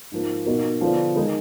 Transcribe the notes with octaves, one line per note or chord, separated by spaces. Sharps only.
G#2 F3 A#3
B2 A#3 D#4 F#4 A#4
D3 F3 B3 D4
D#3 G#3 D#4 A#4